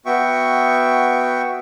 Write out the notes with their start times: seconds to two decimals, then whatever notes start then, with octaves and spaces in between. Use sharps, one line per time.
0.06 B3 F#4 E5 G5 C#6